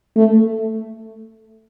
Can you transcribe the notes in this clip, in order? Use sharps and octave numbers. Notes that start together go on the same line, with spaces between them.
A3